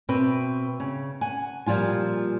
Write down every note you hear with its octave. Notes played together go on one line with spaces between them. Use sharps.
B2 C4 B4 E5
C#3
F#5 G#5
A#2 F3 G3 F4 G#5